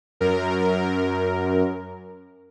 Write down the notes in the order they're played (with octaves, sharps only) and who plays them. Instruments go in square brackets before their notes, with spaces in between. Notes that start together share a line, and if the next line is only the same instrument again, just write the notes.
[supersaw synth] F#2 A#4